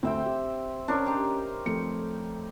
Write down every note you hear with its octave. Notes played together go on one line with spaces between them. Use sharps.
D2 C4 E5 G5
G4
C#4 D4 A#4 C#5
D#4 G4 C5
F2 A3 C#7